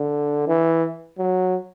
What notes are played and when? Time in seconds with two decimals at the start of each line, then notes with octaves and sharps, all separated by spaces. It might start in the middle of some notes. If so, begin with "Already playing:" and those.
Already playing: D3
0.48 E3
1.19 F#3